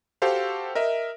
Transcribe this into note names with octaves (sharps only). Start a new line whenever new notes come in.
F#4 G4 A4 C5 F5
A#4 D#5 E5